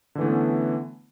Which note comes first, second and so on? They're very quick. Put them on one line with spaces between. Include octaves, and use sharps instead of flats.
D3 E3 A3 C#4 B3